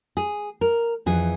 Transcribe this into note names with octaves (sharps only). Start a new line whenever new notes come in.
G#4
A#4
F2 E3 G#4